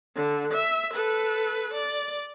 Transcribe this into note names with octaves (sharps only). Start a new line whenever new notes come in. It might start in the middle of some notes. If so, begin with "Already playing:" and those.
D3
E5
A4 B4
D5